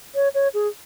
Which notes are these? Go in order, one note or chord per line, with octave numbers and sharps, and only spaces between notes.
C#5
C#5
G#4